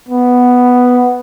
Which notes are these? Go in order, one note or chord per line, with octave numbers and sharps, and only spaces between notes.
B3